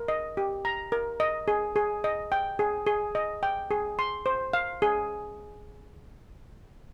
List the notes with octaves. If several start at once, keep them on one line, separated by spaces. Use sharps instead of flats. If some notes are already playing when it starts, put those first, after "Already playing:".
Already playing: A#4
D#5
G4
A#5
A#4
D#5
G#4
G#4
D#5
G5
G#4
G#4
D#5
G5
G#4
C6
C5
F5
G#4